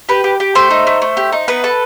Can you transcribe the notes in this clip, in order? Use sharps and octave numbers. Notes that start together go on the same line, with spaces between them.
G4 B4
G4
G4
A3 C5
D#4
A3
A3
G4
D#4
B3 B4
A4